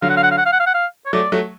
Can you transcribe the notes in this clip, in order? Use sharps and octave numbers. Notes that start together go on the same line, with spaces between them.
D3 F#3 F5
F#5
F5
F#5
F5
F#5
F5
F#5
F5
F#5
F5
C#5
F#3 A3 D5
F#3 A3